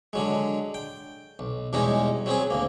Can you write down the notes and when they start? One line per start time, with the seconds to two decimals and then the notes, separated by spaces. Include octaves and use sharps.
0.13 D3 F#3 G#3
0.74 G5
1.39 B1
1.73 E2 B2 G3 G#3 C#4 D#4
2.26 F#3 C4 C#4 G#4
2.50 D2 A#3